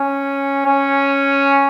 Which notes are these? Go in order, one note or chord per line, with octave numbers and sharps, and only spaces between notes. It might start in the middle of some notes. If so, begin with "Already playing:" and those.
Already playing: C#4
C#4